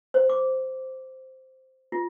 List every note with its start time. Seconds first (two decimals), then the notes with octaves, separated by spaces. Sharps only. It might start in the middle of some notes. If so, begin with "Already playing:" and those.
0.14 C5
0.30 D6
1.92 F4